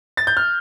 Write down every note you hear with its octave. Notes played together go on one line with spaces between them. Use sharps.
A6
G6
F6